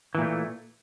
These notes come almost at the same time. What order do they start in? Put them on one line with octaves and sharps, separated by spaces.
E3 A#2 A3